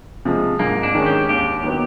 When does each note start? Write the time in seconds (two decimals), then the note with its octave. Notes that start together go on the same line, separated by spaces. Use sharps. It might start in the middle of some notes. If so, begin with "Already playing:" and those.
0.25 C3 F3 G#3
0.59 G#2 A#3
0.83 D4
0.95 D#3 G#3 C#4
1.06 G4
1.29 D#2 G4
1.64 D#3 F#3 B3